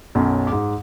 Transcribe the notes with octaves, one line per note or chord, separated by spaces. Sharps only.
B1 F#2
G#2 D6